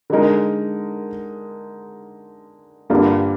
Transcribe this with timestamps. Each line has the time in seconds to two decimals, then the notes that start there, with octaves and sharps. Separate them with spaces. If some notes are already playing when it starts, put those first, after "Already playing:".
0.10 D3 G#3 D#4 A#4
2.90 G2 D3 G3 A#3 F4